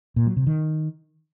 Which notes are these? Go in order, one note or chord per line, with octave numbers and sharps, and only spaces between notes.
A#2
F#3
C3
D#3